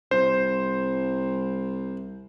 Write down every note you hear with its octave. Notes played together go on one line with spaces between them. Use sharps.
C2 C5